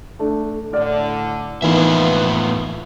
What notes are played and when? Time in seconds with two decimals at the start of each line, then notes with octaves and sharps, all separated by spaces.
0.19 A3 D4
0.73 A2 D3 D5 F6
1.62 A2 E3 F3 A#3 B3 D#4 F4 E5